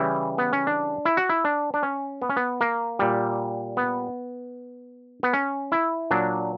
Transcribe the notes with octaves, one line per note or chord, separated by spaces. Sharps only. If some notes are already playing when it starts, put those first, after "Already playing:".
Already playing: C#3 E3 G3 E4
B3
C#4
D4
E4
F#4
E4
D4
D4
C#4
B3
C#4
B3
A#3
A#2 G3
B3
B3
C#4
E4
A#2 F#3 D4